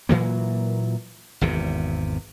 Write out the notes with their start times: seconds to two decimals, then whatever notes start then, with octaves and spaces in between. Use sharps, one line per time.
0.09 A#2 E3 F#3 A#3
1.41 G#1 E2 C3